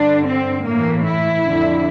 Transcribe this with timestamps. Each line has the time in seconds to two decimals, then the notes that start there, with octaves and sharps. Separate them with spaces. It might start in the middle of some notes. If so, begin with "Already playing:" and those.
Already playing: G2 D3 D4
0.26 C4
0.65 A2 E3 A#3
1.05 E4
1.44 F2 D3